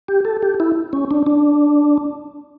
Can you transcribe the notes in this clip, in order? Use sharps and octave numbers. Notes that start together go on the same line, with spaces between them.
G4
A4
G4
E4
C#4
D4
D4